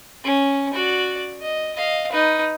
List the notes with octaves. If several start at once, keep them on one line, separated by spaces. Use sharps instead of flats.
C#4
F#4 D5
D#5
D#5 F5
D#4 B4